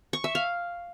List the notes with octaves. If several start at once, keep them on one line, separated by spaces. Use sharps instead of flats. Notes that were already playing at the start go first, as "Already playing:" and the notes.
C#6
E5
F5